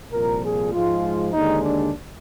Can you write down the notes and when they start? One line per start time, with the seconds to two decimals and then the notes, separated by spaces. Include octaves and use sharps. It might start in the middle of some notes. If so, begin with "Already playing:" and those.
0.12 C2 A#2 F3 A#4
0.42 G#4
0.72 G#2 F3 G#3 F4
1.32 D#2 D3 G#3 D#4
1.63 D4